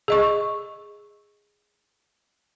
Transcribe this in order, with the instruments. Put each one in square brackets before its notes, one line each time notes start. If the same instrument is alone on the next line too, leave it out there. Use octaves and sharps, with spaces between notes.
[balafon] G#4 D#5 C#6